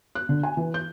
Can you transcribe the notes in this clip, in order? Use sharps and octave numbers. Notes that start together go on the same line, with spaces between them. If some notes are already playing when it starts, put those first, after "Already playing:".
F#6
D3
G#5
E3
G6